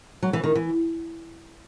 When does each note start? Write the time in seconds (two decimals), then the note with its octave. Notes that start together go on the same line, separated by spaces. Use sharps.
0.23 F#3
0.33 E3
0.44 D#3
0.55 E3